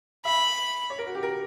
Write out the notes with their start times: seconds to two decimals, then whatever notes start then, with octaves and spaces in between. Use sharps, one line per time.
0.25 E5 B5
0.90 C#5
0.99 A#4
1.06 F#4
1.15 G4
1.23 A#4